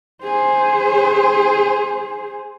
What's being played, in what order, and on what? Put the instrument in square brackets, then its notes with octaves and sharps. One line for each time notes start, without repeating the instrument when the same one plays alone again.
[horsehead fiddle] G#4 C5